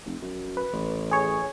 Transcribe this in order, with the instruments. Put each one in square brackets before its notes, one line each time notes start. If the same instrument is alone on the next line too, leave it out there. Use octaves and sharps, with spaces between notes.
[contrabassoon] F1
F#2
[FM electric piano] B4
[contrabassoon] A1
[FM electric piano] G#4 C#5